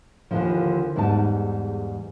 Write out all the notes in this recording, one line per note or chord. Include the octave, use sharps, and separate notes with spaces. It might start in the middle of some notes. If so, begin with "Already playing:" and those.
D#2 G#2 D3 E3 F3
E2 G#2 G3 D#4 A5